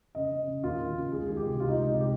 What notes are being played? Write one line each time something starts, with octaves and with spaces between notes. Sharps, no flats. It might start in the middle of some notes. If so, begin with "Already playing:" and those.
C#3 D#5
C#3
C#3
D#2 F4
D#2
C#3
C#2 G#4
D#3 G#4
G4
C3
C#2 F4
D#4
C#2
D#4
C3
G4